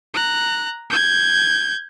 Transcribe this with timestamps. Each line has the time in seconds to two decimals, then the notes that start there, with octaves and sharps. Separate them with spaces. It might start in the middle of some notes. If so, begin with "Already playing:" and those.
0.14 A#5 F#6
0.90 G6 G#6